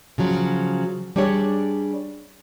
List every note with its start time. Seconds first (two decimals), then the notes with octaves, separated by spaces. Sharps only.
0.18 C#3 F3 F#3
1.16 G3 D4 G4 G#4 C#5